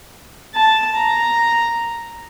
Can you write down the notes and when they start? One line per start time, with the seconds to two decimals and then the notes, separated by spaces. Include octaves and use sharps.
0.55 A5
0.96 A#5